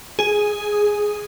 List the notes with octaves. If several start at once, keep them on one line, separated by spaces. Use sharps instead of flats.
G#4